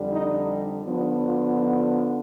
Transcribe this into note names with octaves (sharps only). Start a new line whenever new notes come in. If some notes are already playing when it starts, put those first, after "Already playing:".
Already playing: F2 D3 G3
D#4
D3 F3 B3 D4
F4
D#4